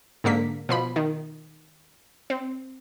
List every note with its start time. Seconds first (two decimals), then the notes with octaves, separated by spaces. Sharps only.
0.24 G#2 D3 A#3 B6
0.69 B2 F3 B5
0.96 D#3
2.30 C4